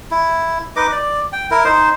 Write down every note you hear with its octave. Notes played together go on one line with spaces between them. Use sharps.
E4
D#4 B4 D#5 D6
D5
G5
E4 A#4
D#4 C5